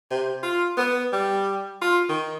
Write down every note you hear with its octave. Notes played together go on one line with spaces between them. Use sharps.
C3
F4
B3
G3
F4
D#3